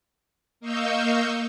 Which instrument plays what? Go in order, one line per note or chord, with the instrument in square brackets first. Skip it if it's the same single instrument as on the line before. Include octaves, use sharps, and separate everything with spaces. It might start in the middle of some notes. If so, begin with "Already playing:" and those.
[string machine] A#3 D#5 F5 C#6 E6 G6